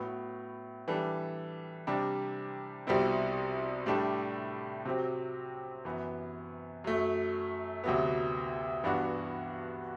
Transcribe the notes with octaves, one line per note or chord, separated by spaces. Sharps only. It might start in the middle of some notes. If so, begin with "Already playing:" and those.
Already playing: A2 F#3 B3
E3 G3 D4 A4
C3 G3 D4
C2 B2 G3 C4 E4
A2 G3 D4 A4
C3 F#3 C4
F#2 E3 B3
F#2 F#3 A3
D2 C3 F#3 B3
G2 E3 B3 D4 F#4